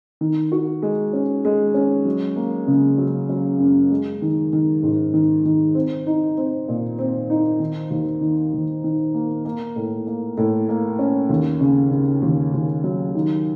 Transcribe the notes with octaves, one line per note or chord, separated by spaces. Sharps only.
D#3
F#4
G#3
C#4
G#3
C#4
F#3
A#3
C#3
F#3
F#3
F#2
G#3
D#3
D#3
G#2
D#3
D#3
C4
D#4
C4
A#2
C4
D#4
D#3
D#2
D#3
D#2
D#3
A#3
A#3
A2
A#3
A2
A#3
C#4
D#2
C#3
C#3
D#2
D#2
F#3
D#3